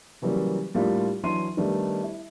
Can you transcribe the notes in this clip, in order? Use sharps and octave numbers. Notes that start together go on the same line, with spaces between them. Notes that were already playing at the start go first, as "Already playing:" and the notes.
C#3 E3 F#3 G3 A#3
A2 G3 A#3 D4 F4
E3 F#3 D4 E4 C6 D#7
D#3 G3 A3 B3 D4 D#4
E4